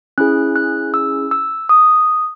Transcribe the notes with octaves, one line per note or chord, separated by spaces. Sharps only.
C#4 E4 G#4 F#6
F#6
E6
E6
D#6